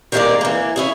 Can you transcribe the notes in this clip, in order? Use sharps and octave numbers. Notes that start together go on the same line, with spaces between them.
D#3 G3 G#3 A#3 A#4 D5
E3 A#3
C#4 E4 G#4